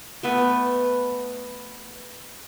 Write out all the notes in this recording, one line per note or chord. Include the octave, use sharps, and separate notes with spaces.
A3 B3 B4